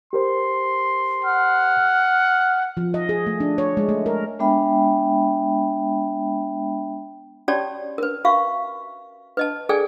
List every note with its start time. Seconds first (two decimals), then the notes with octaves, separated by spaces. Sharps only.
0.13 G4 A#4 C5 C6
1.25 F#5 F6
2.77 F3
2.94 D#5
3.09 G#4
3.27 A3
3.40 D4
3.58 C#5
3.77 G#3
3.89 A3
4.06 A#4
4.39 G#3 B3 D4 E5 G5 B5
7.48 C#4 F#4 G4 C#5 D5 A5
7.98 A#4 B4
8.25 F#4 E5 F5 C#6
9.37 B4 D#5 A5
9.69 G#4 A4 D5 G5 G#5